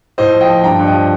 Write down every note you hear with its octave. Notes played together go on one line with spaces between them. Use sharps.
A2 C5 D#5
F3
D#5 G5
F3
G2 G5 A#5
G2
D#5 G5
F3